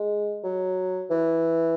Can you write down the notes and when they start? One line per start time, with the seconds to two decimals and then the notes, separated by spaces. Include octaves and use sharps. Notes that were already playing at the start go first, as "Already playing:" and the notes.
Already playing: G#3
0.44 F#3
1.10 E3